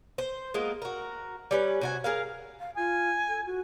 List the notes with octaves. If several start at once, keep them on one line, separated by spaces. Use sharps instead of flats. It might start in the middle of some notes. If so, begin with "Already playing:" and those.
C5
G#3 A#3 B3 F4
F#4 A#4
G3 C#4 B4
C3 F#4 G#5
G#4 A#4 F5
F5
F4 G#5
A4
F#4